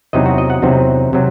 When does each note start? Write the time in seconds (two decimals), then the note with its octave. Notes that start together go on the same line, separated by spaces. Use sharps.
0.13 E2 C3 F#3 C4 D#4 D#5
0.26 F#4
0.38 D#5
0.50 F#5
0.62 E2 C3 F#3 C4 D#4
1.13 C3 F#3 C4